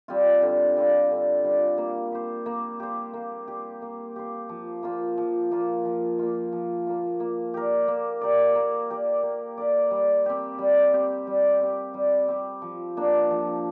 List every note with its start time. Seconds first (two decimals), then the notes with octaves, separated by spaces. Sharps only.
0.08 G3 C4 F4
0.42 D3
0.77 G3 C4 F4
1.11 D3
1.44 G3 C4 F4
1.78 A#3
2.12 G4 C5
2.46 A#3
2.80 G4 C5
3.13 A#3
3.48 G4 C5
3.82 A#3
4.16 G4 C5
4.49 F3
4.83 A#3 F4
5.18 F3
5.51 A#3 F4
5.85 F3
6.19 A#3 F4
6.52 F3
6.87 A#3 F4
7.20 A#3
7.54 G4 A#4 D5
7.88 A#3
8.21 G4 A#4 D5
8.55 A#3
8.90 G4 A#4 D5
9.23 A#3
9.58 G4 A#4 D5
9.91 G3
10.26 C4 G4
10.59 G3
10.93 C4 G4
11.27 G3
11.60 C4 G4
11.94 G3
12.28 C4 G4
12.62 F3
12.97 A#3 D4
13.30 F3